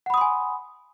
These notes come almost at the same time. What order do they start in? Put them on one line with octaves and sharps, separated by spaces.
F#5 B5 D#6 C6 G#5